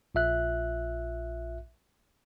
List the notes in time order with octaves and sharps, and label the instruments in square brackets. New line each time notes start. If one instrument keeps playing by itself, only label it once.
[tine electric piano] A#1 F4 E5 F#6